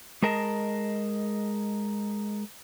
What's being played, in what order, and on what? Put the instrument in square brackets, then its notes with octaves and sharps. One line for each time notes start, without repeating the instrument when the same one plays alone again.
[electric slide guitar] G#3 G#4 A#4 D#5 A5